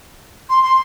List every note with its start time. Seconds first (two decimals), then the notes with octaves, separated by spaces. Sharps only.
0.49 C6
0.63 C6